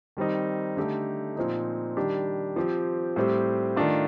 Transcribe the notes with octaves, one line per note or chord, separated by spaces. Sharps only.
D#3 G3 C4 D#4
D3 A3 D#4 G4
A#2 F3 C4 D#4
D#3 G3 D4 G4
F3 C4 G4
A2 G3 C4 G4
D#3 A3 D4 F4